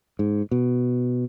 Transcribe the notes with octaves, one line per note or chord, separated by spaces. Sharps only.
G#2
B2